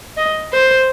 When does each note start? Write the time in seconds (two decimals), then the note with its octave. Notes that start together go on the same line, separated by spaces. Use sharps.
0.17 D#5
0.52 C5